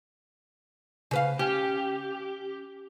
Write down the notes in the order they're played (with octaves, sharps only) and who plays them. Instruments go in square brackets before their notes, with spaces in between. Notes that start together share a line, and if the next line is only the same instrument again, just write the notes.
[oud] C#3 B4 F5
[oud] C#4 [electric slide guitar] G4